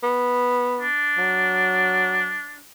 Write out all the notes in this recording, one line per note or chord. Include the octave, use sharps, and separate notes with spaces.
B3
D4
F#3